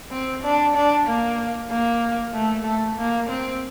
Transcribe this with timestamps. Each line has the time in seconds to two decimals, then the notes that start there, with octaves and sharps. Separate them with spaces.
0.11 C4
0.43 D4
0.74 D4
1.07 A#3
1.70 A#3
2.33 A3
2.65 A3
2.97 A#3
3.29 C4